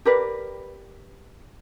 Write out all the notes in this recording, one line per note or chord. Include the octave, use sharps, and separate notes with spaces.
G4 A#4 B4 D5